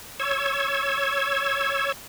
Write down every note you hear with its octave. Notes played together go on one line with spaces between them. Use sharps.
C#5 E6 G#6